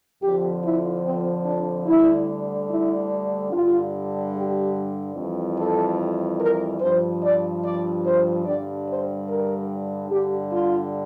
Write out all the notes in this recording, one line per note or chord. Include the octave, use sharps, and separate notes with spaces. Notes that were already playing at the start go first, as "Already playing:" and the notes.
F2 D3 F3 G4
E4
C4
D4
D2 D3 G3 E4
E4
G2 D3 G3 F4
G4
F2 E3 G3
A4
A#4
G2 F3 C5
D5
D5
C5
G2 D3 G3 D5
C5
A#4
G2 D3 G3 G4
F4